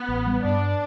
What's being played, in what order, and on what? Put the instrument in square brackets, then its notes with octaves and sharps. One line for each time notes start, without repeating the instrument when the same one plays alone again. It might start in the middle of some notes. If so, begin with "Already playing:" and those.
Already playing: [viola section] B3
[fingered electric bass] A1
G3
[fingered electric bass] G2 [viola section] D4